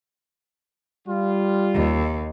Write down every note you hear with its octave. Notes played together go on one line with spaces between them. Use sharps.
G3 F4
D#2